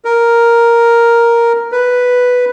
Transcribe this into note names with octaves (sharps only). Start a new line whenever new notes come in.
A#4
B4